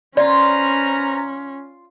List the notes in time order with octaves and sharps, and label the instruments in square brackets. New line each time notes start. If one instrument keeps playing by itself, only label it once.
[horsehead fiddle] C#4 [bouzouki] F4 [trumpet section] B4 C5 A#5 [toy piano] D5